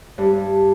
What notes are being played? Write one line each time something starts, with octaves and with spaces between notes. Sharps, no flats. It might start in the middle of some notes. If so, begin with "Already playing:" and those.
G2